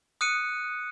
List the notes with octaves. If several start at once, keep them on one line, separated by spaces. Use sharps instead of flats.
D#6 F#6 C#7 D#7